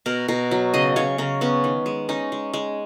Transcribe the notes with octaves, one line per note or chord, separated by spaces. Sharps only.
B2 A#4
B2 A#4
F#3
C#3 D#5
C#3 C#5
C#3 A#4
B3 C#4
D#3
G#3
C#4 D#4
G#3
G#3